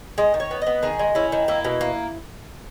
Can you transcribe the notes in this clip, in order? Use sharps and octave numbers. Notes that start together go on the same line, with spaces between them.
G#3 D#5
D#3
C#5
B3
B3 D#5
D#3 G#4
G#3
C#4 E4
D#3
A#3 E4
B2
A#3